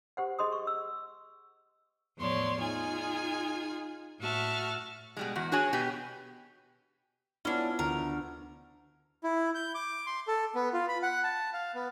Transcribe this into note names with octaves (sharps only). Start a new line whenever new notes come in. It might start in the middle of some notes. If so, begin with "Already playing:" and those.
G4 C5 F#5
G#4 D#5 C6 D#6
C#6
E6
E2 A2 F3 C#5 D5 C6
D#4 F4 G#4 G#5
A2 F#4 E5 A5 F6
B2 G3 G#3
E2 F#4
D4 F#4 G#4 C#5 G#5
B2 B3 G4
B3 C#4 D4 E4 F4
D2 A#4
E4
G6
D6
C6
A4
B3
F4
B5
F#5
A5
F5
B3